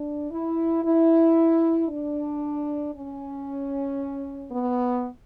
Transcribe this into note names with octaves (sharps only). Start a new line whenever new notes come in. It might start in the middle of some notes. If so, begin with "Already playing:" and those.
Already playing: D4
E4
E4
D4
C#4
B3